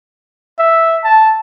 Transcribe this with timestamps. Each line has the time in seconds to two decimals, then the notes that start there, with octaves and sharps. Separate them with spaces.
0.59 E5
1.04 A5